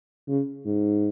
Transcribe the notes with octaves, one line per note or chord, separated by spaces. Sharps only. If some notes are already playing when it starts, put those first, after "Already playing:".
C#3
G#2